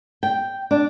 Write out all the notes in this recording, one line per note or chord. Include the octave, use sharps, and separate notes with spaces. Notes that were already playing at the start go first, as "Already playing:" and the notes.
G5
D4